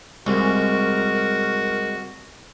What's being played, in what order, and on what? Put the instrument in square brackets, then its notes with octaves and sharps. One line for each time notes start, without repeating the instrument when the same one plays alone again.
[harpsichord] C2 [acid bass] G#3 [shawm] F#4 [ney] A#4